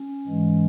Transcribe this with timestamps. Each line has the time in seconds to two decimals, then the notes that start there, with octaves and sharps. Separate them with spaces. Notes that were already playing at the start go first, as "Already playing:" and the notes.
Already playing: C#4
0.27 G#2 E3 G#3